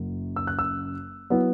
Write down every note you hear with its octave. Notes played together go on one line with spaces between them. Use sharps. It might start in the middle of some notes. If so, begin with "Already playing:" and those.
Already playing: F#1 F#2 F#3
E6
F#6
E6
F#3 B3 E4